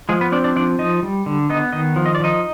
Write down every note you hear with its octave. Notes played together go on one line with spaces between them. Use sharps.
F3 G#3 G#4
B3 B4
C4 D4 D5
D4 D5
F3 D4 D5
F3 D#4 D#5
G3
D3
B3 D#4 D#5
D#3 D#4 D#5
F3
D#5
D5
F3 D#4 D#5